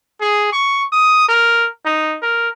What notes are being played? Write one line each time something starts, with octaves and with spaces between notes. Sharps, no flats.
G#4
C#6
D#6
A#4
D#4
A#4